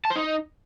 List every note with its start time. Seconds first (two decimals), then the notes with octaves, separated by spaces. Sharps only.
0.05 A5
0.10 C5
0.16 D#4